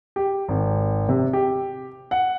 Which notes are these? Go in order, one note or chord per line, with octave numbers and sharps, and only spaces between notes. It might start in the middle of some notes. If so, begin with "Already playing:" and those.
G4
G#1
C3
G4
F#5